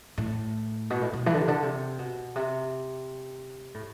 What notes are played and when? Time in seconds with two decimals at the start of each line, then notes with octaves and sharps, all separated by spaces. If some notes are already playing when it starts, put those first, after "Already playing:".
0.18 A2
0.90 B2
1.02 A2
1.13 B2
1.26 E3
1.34 D3
1.41 C3
1.48 D3
1.63 C3
1.99 B2
2.36 C3
3.74 A2